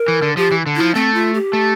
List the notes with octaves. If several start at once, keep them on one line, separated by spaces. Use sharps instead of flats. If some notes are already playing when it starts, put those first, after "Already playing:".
Already playing: A#4
E3
D3
F3 G4
E3
D3
F3 E4
A3 C4
F4
G4
A3